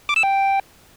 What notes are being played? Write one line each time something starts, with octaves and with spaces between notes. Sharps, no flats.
D6
E6
G5